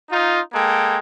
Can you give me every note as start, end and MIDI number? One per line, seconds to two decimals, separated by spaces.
0.11 0.40 63
0.11 0.40 65
0.54 0.98 56
0.54 0.98 58
0.54 0.98 69
0.54 0.98 79